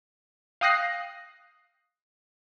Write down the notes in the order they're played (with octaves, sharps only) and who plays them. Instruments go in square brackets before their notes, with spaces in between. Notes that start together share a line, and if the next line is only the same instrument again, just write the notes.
[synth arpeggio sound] F5 G5 D#6 F#6 A#6 C7